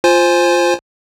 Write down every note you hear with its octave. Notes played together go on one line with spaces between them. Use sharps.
F4 C5 G#5